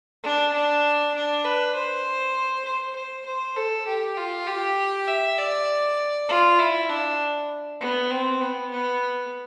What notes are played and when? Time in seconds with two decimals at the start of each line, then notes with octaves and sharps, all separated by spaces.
0.23 D4
0.53 D4
1.14 D4
1.44 B4
1.75 C5
2.65 C5
2.95 C5
3.26 C5
3.56 A4
3.86 G4
4.17 F4
4.47 G4
5.08 E5
5.39 D5
6.29 F4
6.59 E4
6.90 D4
7.80 B3
8.10 C4
8.41 B3
8.71 B3